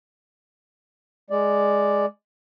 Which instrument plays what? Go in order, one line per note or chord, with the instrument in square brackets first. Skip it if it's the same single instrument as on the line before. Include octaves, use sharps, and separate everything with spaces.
[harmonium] G#3 D5